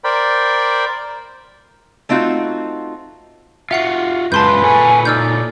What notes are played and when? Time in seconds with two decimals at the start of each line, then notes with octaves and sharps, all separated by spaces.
0.04 A#4 C5 D5 G5 B5
2.09 A3 C4 D#4 F4 F#4
3.71 F4 F#4 E5 F#5 C7
4.32 F#2 G#3 F4 B4 A5 C6 G6
4.63 A#2 A4 C#5 G#5
5.05 D#4 D5 E6 F6 G6